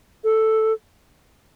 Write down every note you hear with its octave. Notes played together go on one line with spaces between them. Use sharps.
A4